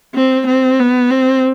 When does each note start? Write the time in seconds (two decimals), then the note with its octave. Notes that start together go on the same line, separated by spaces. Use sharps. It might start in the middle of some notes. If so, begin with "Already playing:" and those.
0.15 C4
0.47 C4
0.79 B3
1.11 C4